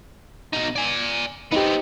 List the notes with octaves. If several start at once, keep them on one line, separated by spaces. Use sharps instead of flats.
B2 D#4 D#7
D5 G#5
B3 C4 D#4 G4